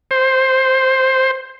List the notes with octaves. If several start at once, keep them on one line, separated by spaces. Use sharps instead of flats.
C5